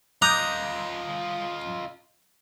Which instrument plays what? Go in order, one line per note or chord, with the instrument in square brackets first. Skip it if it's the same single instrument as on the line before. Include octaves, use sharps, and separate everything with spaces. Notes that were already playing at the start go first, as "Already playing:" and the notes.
[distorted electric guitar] F4 D#5 [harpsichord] A#5 [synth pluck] D6 D#6 G6 [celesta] F#6